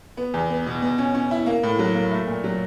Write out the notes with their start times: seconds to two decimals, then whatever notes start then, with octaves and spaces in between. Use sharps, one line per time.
0.17 B3
0.34 E2
0.50 B3
0.66 B2
0.82 B2
0.98 C#4
1.15 C#4
1.31 E4
1.46 A#3
1.63 A2
1.79 F#3
1.95 A#3
2.11 A3
2.27 A#2
2.44 F#3